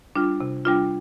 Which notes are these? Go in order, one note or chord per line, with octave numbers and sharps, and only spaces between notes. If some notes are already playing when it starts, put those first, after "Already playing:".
G3 D4 F4
C3
G3 D4 F4